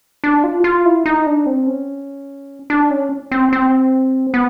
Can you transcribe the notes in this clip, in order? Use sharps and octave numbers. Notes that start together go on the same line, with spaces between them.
D4
F4
F4
E4
D#4
D4
C4
C#4
D4
C#4
C4
C4
B3